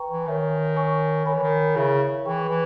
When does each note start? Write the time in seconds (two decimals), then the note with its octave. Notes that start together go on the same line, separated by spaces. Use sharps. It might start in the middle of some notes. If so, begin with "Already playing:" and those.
Already playing: B4 G5 A#5 C#6
0.10 E3
0.27 D#3 C#5 E5 G#5
0.76 A#4 C#5 G#5 C#6
1.25 D#3 C#5 G#5 B5
1.34 E3
1.43 D#3
1.75 C#3 E4 A#4 C#5 E5
2.25 E3 G#4 B4 G5 C#6
2.49 E3